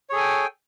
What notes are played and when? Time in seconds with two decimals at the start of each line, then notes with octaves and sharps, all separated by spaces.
0.10 C#5
0.12 G#4
0.15 A4
0.17 G#5
0.20 G5